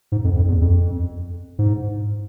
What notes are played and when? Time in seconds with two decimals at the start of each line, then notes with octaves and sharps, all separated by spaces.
0.12 G#2
0.24 F2
0.36 F2
0.48 E2
0.61 F2
1.59 G#2